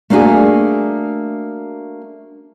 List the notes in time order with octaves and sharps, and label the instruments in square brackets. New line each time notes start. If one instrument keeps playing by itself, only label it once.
[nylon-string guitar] A3 A#3 D4 F#4 G#4